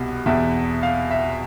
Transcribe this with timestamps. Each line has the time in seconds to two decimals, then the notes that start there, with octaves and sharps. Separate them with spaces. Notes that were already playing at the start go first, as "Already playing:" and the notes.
Already playing: C2 B2
0.26 E2 B2 E5
0.83 F5
1.11 E5